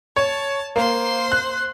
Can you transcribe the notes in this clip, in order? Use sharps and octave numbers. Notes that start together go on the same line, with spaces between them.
C#5 A5
A#3 C5 C6
F#6